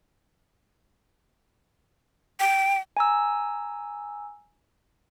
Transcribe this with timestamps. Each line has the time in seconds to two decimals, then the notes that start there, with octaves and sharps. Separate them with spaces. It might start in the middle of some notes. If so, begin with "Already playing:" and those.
2.40 G5
2.97 G#5 A#5 E6